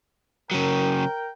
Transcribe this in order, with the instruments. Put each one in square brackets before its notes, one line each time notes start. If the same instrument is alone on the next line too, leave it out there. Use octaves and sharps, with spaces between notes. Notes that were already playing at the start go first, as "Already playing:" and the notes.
[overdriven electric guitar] C#3 F#3 [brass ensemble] A#4 G5